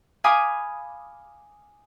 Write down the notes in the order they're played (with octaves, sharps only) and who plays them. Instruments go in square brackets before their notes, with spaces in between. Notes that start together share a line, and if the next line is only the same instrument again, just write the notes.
[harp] F5 G#5 B5 D6 D#6